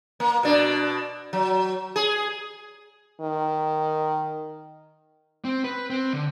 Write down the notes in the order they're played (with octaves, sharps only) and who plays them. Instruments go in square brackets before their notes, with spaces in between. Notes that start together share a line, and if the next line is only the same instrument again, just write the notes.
[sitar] A#3
B2 D4
F#3
G#4
[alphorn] D#3
[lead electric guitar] C4
B4
C4
D3